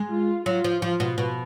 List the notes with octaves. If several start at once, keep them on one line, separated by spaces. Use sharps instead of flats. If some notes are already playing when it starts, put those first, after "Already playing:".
Already playing: G#3
F4
F#3 F4
F3
F3 F4
B2
B2